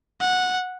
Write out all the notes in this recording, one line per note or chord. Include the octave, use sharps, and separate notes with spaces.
F#5